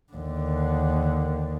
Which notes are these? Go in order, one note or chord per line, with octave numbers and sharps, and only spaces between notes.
D#2 D3